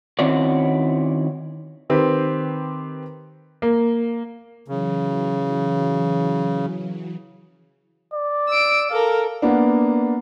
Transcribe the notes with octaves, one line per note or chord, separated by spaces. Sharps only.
D#3 C4 C#4 E4 F#4 D5
D#3 C4 G4 B4 C5
A#3
C#3 E3 F#3
D5
E6 D7
A4 A#4 F5
A#3 B3 D4